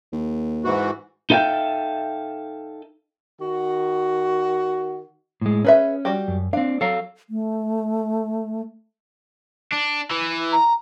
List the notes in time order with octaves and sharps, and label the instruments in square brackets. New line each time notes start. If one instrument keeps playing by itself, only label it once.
[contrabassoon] D#2
[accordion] G#2 E3 F#4
[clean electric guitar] D#4 A4 E5 F5 G5
[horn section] D#3 F#4
[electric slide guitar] A2 G#3
[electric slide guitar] C#4 [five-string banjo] G#4 B4 E5
[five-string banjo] G3 F#4 G4
[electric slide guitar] F#2
[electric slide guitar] C4 D4 [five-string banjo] F5
[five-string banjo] F#3 [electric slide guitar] A4 F5
[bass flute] A3
[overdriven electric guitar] D4
E3
[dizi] A#5